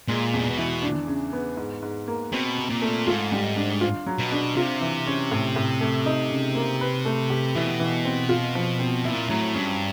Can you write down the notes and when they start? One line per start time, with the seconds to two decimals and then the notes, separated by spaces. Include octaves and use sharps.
0.08 A#2 G#3
0.33 E2 C3
0.46 B2
0.57 E3
0.82 D4
1.07 C#3
1.33 B3
1.57 G#2
1.82 G#2
2.07 A#3
2.32 B2 C4
2.58 C3
2.70 A#2
2.82 A3
3.07 G#2 F4
3.32 G3
3.56 D4
3.81 F4
4.06 F#3
4.19 B2
4.32 D4
4.56 C3 F4
4.81 E3
5.07 C#4
5.31 A2
5.56 A2
5.81 A3
6.06 D#4
6.30 C#3
6.55 A#3
6.81 B4
7.05 A3
7.30 G4
7.55 B2 E3
7.80 E3
8.05 C4
8.29 F4
8.55 F3
8.79 C4
9.05 A#2 E4
9.29 A2 F#3
9.54 G2 C#4